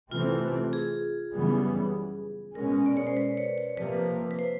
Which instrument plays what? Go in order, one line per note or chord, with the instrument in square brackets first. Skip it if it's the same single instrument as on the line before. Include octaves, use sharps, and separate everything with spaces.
[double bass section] C3 E3 A3 C4 [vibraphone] F4
[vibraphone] G#4
[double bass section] F#2 C#3 E3 G3 B3
[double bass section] B2 G#3 C#4 [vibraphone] A#4
[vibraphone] D5
C#5
C5
B4
C#5
C#5
[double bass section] C3 F3 A#3 [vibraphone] B4
[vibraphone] B4
C5